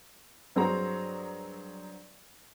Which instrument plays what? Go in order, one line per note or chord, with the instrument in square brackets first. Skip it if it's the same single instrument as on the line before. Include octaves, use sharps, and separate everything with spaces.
[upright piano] G2 F#3 C4 F#4 G#4 A#5